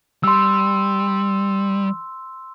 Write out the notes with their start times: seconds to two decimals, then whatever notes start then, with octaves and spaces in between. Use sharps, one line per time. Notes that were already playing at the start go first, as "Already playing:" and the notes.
0.23 G3 C6 E6